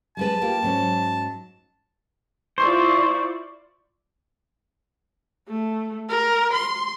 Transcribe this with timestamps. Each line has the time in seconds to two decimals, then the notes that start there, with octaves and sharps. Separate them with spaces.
0.17 G3 G#3 B4 A5
0.41 A#3 F4 G4
0.63 G#2 F#3 C#4
2.58 E4 F4 C5 D5 C#6
5.48 A3
6.09 A#4
6.53 C6